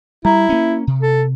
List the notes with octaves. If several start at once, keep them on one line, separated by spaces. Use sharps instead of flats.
G3 E4 A#5
A#3 C#4
C3
A4